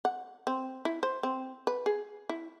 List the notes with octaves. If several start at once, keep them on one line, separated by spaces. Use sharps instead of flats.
F#5
C4
E4
C5
C4
B4
G#4
E4